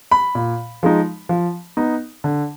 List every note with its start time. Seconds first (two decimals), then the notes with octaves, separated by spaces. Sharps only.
0.11 B5
0.35 A#2
0.83 F3 G#3 D#4
1.29 F3
1.77 B3 D#4
2.24 D3